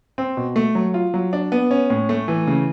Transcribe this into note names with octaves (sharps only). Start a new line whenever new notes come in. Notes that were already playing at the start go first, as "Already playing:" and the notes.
C4
B2
A3
F#3
F4
F#3
D4
B3
C#4
A2
A3
E3
C#3